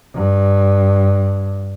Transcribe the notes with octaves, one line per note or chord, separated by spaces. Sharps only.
G2